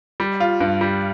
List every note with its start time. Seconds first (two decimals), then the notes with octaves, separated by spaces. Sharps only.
0.20 G3
0.40 F4
0.61 G2
0.81 G3